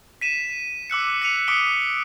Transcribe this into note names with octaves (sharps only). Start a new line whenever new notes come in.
B6 D#7 E7
D6 E6 F#6 C#7
B6 C#7 D#7 F7
D6 D#6 B6 C#7 D7 G7